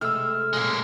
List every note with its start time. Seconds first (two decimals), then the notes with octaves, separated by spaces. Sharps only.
0.01 C3 G#3 A3 E6 F6
0.53 F#2 A#2 G#3 A#3